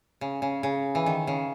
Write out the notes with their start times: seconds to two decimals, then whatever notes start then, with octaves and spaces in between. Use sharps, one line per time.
0.21 C#3
0.42 C#3
0.63 C#3
0.95 E3
1.06 D#3
1.27 C#3